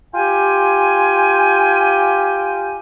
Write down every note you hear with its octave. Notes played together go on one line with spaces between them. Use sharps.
F4 G4 G5 G#5